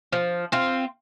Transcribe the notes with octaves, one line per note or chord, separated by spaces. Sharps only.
F3
C4 F4